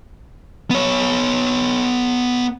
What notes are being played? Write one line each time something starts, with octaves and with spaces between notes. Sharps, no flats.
B3 C#5